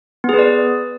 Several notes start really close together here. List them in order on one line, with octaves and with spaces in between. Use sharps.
B3 G#4 B4 D5